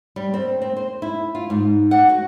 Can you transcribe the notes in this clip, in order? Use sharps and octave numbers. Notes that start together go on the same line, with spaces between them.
G3
C4
C4
C5
E4
F4
G#2
F#5
F#4